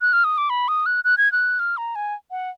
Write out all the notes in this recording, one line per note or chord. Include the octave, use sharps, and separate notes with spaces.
F#6
F6
D#6
D6
B5
D#6
F#6
F#6
G#6
F#6
F6
A#5
G#5
F#5